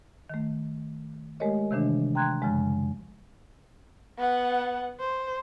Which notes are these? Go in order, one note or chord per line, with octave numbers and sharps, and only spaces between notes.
D#3 A3
G#3 A3 G4 A#4 C#5 D#5
C3 D#3 E3 A3 D4
G5 A#5 C6 F#6 G#6
F#2 C#3 F3 G#3
B3 F#5
C5